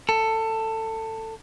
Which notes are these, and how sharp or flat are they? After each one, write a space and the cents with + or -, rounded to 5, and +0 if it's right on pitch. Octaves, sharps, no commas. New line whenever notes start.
A4 +20